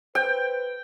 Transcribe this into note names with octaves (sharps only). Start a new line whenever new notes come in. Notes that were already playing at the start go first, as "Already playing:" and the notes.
B4 C5 G5